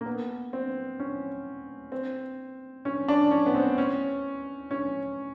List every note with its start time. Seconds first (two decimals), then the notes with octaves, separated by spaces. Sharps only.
0.01 A#3
0.06 B3
0.53 C4
1.00 C#4
1.92 C4
2.85 C#4
3.08 D4
3.31 C#4
3.46 B3
3.55 C4
3.78 C#4
4.71 C#4